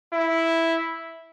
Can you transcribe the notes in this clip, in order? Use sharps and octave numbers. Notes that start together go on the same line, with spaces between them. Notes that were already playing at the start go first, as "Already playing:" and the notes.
E4